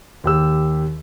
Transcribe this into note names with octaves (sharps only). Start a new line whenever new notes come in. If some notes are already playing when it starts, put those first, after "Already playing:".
D#2 G4 E6